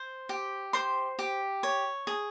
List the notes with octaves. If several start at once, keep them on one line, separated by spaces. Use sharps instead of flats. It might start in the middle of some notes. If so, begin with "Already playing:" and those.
Already playing: C5
G4
C5 C6
G4
C#5
G#4